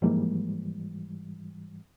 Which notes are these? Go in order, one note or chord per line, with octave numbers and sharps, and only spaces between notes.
G#2 E3 F3 G3 G#3 A#3